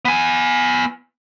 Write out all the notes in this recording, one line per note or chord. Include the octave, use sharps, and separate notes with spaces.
B3 G#5